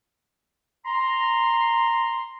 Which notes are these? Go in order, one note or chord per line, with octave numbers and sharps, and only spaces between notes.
A#5 C6